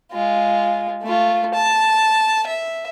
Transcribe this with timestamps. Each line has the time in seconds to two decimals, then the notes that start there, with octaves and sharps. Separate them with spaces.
0.12 G#3 F4
1.03 A3 F4
1.54 A5
2.47 E5